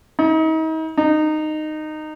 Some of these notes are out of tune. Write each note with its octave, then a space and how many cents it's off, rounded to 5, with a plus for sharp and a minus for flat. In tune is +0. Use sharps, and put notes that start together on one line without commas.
D#4 +40
D#4 -15